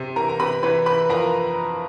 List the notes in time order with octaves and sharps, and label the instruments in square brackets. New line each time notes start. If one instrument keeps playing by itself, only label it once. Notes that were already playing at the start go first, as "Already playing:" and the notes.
Already playing: [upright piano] C3
E3 A#4 A#5
A#5
C3 B4 B5
E3 B4 B5
E3 B4 B5
F2 A#4 A#5